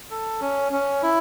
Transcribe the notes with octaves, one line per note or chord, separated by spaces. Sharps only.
A4
C#4
C#4
E4